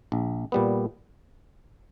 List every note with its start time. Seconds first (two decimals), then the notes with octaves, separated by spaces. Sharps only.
0.12 A#1
0.52 A#2 G3 B3